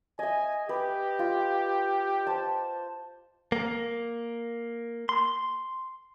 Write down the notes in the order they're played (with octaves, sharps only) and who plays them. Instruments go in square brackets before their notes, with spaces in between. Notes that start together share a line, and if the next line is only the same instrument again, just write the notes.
[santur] D#5 E5 [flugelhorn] G#5
[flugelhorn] G4 [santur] B4
[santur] F4
C5 A5
[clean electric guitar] A#3
C6